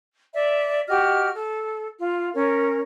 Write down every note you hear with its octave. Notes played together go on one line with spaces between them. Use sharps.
D5 E5
F#4 G4 D#5 F6
A4
F4
C#4 A#4